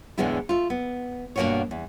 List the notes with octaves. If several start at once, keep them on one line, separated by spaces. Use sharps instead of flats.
E2 A2 D3 G#3 B3 E4
A3 F4
B3
G2 B2 G#3 A#3 B3 C#5
E2